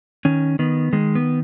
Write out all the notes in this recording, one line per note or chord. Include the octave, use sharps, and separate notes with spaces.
D#3 C#4
D#3 B3
D#3 G#3
B3